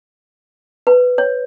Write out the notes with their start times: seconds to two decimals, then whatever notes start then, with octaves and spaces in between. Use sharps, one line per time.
0.87 B4
1.18 C#5